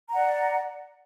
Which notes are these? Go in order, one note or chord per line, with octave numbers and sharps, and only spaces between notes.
D5 F#5 A#5